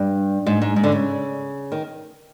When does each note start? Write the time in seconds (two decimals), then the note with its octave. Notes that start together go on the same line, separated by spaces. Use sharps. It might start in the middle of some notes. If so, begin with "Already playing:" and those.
Already playing: G2
0.46 G#2
0.62 G#2
0.76 G#2
0.83 D3
0.92 C#3
1.72 D#3